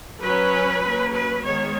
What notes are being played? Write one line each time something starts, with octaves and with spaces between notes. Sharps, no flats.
F#3 C#4 B4
F#3 A#3 C#4
B4
D#3 G#3 B3 C#5